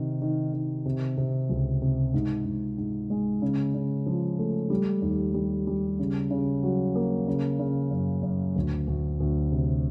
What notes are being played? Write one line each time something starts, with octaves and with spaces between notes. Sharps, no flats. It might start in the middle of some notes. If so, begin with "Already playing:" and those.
Already playing: C3 D#3
D#3
D#3
C3
C3
C#2
C3
G#2
G#2
G#2
G#3
C#3
C#3
F3
A3
G3
D#2
G3
G3
C#3
C#3
F#3
A#3
C#3
C#3
F#2
F#2
D2
D2
D2
C3